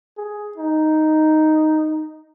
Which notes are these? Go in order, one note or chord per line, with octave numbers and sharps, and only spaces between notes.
G#4
D#4